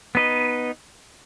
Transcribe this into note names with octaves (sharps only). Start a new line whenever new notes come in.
B3 D#4 B4 D#5